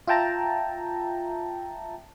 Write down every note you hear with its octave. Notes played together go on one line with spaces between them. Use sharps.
F4 E5 G5 A5 A#5